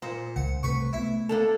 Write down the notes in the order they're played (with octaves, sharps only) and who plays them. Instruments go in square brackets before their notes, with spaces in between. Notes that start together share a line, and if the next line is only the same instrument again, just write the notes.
[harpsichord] A#2 [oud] C5
[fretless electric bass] C#2 [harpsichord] F#5
[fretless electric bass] C2 C3 A3 [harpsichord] B4 C#6
[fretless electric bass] A3 B3 [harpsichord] E4
[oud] A#3 D4 A4